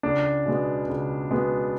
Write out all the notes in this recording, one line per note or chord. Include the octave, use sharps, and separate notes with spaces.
C#2 D4
B2 G#3 B3
C#2
B2 G#3 B3